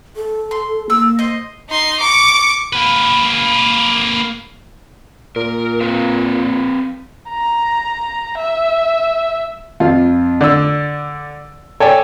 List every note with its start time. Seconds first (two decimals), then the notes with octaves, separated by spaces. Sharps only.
0.16 A4
0.51 C6
0.90 A#3 E6
1.19 C5 D#5
1.69 D#4 C6
2.01 C#6 D6
2.73 A#3 B4
5.36 A#2 A#4
5.81 C4 B4 F5
7.30 A#5
8.38 E5
9.80 F2 F4
10.41 D3 D5 E6
11.80 A4 C#5 D5 G5 G#5